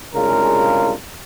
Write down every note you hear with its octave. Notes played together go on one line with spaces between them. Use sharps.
C2 C#3 G#3 D4 F4 A#4